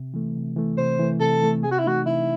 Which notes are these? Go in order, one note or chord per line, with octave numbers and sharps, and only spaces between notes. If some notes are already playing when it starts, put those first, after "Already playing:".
Already playing: C3
E3 A3
C3
E3 A3
C3 C5
E3 A3
C3 A4
E3 A3
C3 G#4
F#4
E4
E3 A3 D#4 F#4
C3 E4